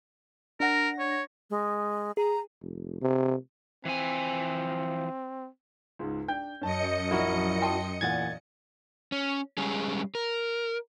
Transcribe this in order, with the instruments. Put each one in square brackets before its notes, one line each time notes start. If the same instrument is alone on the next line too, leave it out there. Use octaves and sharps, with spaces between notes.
[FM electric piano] D4 F#5 A#6 [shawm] A#4
[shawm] C#5
[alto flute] G#3
[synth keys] G#4 [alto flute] A#5
[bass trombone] F1
C3
[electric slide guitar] E3 F3 G#5 [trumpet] C4
[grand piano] C#2 G#2
D4 G5 G6
[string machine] F#2 D#5 C#7 [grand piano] C#4 A5
[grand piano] A#1 [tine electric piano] E4 F#4 A#4
[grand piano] G5 A5 C6
[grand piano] E2 A#2 F#5 [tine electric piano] G#6 A6
[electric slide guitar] C#4
G3 G#3 C#4 G#4
A#4